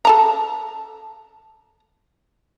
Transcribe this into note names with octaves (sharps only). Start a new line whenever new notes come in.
A4 A5 A#5